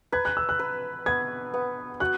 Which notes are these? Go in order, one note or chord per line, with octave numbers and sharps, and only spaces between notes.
B4 G#6
F#6
E6
F#6
B4
B3 G#6
B3
F#4 F#6